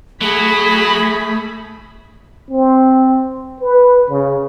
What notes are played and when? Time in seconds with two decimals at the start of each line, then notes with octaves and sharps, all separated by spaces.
0.21 F#3 A3 G#4 B5
2.50 C4
3.60 B4
4.10 C#3